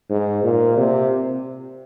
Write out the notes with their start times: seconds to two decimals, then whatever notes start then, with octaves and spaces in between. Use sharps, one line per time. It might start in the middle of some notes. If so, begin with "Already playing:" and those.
0.10 G#2
0.44 A#2
0.77 C3